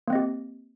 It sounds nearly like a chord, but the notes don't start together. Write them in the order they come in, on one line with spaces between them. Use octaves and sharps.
A#3 C4 D#5 G4